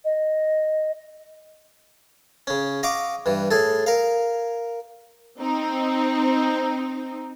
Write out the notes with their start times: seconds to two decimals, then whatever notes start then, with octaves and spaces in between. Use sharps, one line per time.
0.05 D#5
2.47 C#3 C#4
2.83 D#5 F5 F#5 C#6 D6
3.26 G2 E3
3.51 A2 G#4 A4
3.86 A#4 F5
5.39 C4 D#4